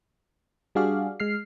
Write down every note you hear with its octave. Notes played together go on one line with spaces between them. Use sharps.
G3 D4 F#4 G#4 D5 F5
G#3 F6 C7